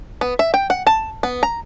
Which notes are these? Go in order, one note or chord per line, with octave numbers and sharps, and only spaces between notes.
B3
E5
G5
F#5
A5
B3
A#5